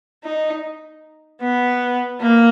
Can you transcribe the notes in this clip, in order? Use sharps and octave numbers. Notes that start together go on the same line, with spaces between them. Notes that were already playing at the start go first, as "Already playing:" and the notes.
D#4
B3
A#3